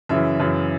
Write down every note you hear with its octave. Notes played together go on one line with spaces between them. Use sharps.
F#2 C#3 E3 E5
F#2 C#3 E3